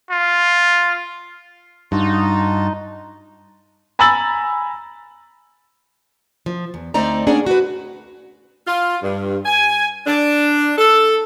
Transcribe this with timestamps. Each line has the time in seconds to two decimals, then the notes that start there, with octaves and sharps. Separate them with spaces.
0.11 F4
1.92 G2 D#4 F4 F#4 A5
3.99 G#5 A#5 B5 E6 A6 F#7
6.46 F3
6.74 E2
6.94 D2 A3 C4 D#4 D5 A#5
7.27 A#3 C#4 D4 G#4 D5 F#5
7.46 F#4 B4
8.67 F4
9.01 G2
9.46 G#5
10.07 D4
10.77 A4